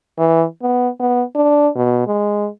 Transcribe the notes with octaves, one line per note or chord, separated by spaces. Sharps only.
E3
B3
B3
D4
B2
G#3